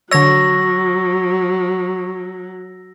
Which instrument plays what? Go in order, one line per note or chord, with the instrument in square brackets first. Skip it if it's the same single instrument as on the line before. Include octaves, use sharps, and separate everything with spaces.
[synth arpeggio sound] D3 C#5 [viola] F#3 [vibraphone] C#6 [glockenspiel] E6 A#6